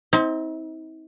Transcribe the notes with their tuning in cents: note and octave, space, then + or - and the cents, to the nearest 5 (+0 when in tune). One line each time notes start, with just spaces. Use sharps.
C4 +0 D#4 +45